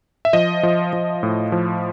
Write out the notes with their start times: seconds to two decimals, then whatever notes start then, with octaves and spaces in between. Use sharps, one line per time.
0.25 E5
0.33 F3 D#5
0.63 F3
0.93 F3
1.23 A2
1.52 F3